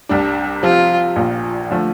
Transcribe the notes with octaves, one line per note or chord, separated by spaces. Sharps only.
C2 C3 G3 D4
C3 F3 C4 F4
A#1 A#2 F3
D3 F3 A3